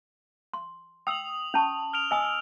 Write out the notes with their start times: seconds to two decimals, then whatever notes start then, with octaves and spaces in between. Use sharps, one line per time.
0.54 C6
1.07 G5 D#6 E6 F7 F#7
1.54 C#4 A5 C#6
1.94 F6 D7 F7
2.11 D#5 G#5 D#6 E6